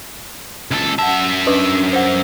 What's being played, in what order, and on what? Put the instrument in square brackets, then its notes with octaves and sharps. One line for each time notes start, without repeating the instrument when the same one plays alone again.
[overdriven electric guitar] C#2 A4
[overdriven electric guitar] F#2 E5 [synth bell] F#5 A5
[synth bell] C#4 D4 B4
C5 F#5